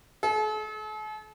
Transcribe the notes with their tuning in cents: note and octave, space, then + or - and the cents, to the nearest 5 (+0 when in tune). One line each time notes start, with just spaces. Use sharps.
A4 -45